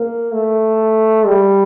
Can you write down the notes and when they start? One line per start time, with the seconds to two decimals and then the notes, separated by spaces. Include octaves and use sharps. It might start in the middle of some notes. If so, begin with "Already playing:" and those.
Already playing: A#3
0.32 A3
1.26 G3